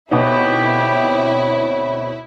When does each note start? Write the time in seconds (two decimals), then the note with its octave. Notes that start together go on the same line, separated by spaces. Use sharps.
0.11 D2 B2 B3 C4 D#4 E4 G4 C#5